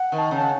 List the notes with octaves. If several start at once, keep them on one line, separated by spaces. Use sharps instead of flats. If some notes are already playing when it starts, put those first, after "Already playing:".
Already playing: F#5
D#3
A5
C#3
A5
F#5